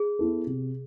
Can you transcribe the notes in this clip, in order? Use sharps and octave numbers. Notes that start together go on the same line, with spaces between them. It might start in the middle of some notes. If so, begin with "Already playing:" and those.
Already playing: G#4
B3 E4 A4
C3